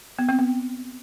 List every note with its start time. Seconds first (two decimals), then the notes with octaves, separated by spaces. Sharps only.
0.19 B3
0.29 C4
0.39 B3